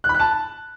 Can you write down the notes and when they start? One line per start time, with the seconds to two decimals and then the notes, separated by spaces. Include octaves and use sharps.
0.04 F#6
0.09 B5
0.14 F#6
0.20 A5